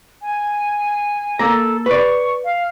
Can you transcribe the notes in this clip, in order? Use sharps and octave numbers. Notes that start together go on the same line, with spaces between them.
G#5
A#3 A4 A#5
B4 D5 C#6
F5